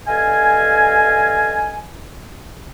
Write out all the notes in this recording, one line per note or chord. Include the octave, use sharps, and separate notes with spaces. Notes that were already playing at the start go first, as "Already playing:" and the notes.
G2 A4 D#5 F5 G#5